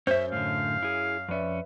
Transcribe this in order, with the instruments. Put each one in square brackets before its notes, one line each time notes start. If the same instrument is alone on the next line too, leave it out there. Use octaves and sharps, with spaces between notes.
[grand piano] F#2 C#5 G6 [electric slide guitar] C#4 E5 [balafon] C5
[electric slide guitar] A2 D3 [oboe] F5
[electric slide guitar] E4 G#4
[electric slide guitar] F2 C#4 [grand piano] B4 D5 E5